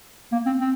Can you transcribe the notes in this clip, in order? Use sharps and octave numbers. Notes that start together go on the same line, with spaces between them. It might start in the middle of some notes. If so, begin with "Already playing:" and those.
A#3
C4
C4